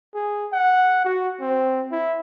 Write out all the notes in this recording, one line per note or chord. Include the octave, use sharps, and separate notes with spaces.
G#4
F#5
F#4
C4
E4